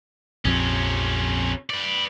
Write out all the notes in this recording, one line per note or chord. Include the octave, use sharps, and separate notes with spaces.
A#1 F2 C3 C#4
B4 D5